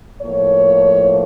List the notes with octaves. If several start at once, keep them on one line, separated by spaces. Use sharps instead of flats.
A2 F3 A#3 C#5